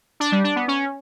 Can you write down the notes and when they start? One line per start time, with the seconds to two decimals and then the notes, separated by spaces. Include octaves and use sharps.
0.20 D4
0.32 G3
0.44 D4
0.56 B3
0.68 C#4